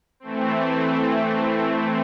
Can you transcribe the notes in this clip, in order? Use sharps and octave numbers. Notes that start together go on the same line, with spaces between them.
E3 A3 C4